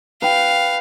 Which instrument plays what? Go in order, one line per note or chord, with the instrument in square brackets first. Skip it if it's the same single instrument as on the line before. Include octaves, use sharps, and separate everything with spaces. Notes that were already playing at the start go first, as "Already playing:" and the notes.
[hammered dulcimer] B4 G5 [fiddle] F5